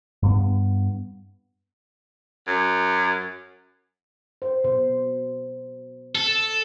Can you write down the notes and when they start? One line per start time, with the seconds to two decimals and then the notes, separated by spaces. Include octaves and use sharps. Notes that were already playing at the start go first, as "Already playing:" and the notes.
0.22 G2 B3
2.47 F#2
4.42 C5
4.64 B2 C5
6.15 A4